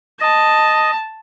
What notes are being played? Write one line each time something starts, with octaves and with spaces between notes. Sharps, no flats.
D#5 A5